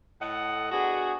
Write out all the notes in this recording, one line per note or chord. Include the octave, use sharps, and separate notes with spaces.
A2 A4 D#5 F#5
B3 D4 F#4 G#4